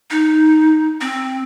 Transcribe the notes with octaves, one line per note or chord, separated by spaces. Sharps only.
D#4
C4